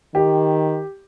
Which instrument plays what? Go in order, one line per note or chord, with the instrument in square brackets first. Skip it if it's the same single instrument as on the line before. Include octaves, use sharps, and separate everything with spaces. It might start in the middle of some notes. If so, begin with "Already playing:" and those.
[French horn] D#3 [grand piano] G4